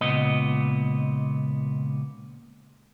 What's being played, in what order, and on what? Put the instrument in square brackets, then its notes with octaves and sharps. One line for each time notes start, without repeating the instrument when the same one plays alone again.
[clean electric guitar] C#2 A#2 B3 D#5